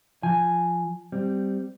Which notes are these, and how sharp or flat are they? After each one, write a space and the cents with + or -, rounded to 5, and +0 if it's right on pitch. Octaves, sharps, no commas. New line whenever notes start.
F3 -5 G#5 +0
G3 +0 C4 -10